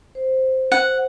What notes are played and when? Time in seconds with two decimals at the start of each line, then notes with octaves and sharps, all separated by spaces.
0.15 C5
0.72 F#5